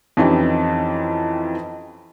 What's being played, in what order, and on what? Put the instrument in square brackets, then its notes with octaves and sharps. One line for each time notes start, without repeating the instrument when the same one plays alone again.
[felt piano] F2 E3 C#4 D#4 G4